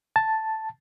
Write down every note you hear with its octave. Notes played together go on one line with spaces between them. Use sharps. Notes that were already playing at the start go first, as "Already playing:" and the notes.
A5